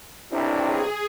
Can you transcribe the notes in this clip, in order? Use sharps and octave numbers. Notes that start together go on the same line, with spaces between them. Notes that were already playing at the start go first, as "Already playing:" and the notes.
B1 C3 C4 D4 E4
G#4